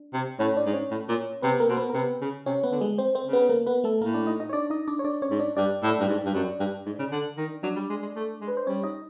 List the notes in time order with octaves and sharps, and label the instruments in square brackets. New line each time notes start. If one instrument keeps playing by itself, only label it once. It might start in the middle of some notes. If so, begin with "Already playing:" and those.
Already playing: [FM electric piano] D4
[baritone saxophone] C3
[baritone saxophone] A2 [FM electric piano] C#4 C#5
[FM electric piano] D4 D5
[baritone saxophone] G#2
[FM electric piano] C#4 C#5
[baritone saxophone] A2
A#2
[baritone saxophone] C3 [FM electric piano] B3 B4
[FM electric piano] A#3 A#4
[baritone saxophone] B2 [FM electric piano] C5
[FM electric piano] B3 B4
A#4
[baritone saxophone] C3 [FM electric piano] B3 B4
[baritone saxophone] C#3
[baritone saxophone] C3 [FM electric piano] C#4 C#5
[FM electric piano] B3 B4
[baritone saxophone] D3
[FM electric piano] G#3 G#4
C4 C5
C4 C5
[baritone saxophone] C#3
[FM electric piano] B3 B4
A#3 A#4
B3 B4
A3 A4
[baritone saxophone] A2 [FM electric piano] A#3 A#4
[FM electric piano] D4 D5
D#4 D#5
D#4 D#5
C#5
D4 D5
D#4 D#5
D4 D5
C#5
D4 D5
C#4 C#5
[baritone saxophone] G#2
[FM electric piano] D4 D5
[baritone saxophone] G2 [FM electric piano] D4 D5
[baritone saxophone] A2
G2
G#2
G2
F#2
G2
G#2
C#3
D3
D#3
[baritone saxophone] F#3 [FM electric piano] D4 D5
[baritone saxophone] G3
G#3
G#3
A3
G#3
[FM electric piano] B4
C5
[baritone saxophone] G3 [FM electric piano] C#4 C#5
[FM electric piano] D#4 D#5